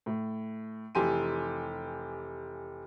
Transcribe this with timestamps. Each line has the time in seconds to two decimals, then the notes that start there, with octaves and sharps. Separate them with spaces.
0.06 A2
0.95 F1 E3 G4 G#5 C6 D#7